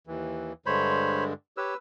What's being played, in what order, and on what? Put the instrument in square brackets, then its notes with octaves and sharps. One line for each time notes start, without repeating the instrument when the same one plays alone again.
[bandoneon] D#2 E3
[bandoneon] G2 D3 G#3 [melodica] C5 C#5 B5
[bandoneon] G4 C#5 [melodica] B4 E6